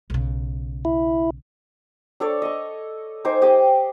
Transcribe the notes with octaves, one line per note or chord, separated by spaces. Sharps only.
B1 C#3
E4
D4 A4 C#5 D5
D#5 C#6
D#4 C5 G#5 D6
G4 D#5 G5 D6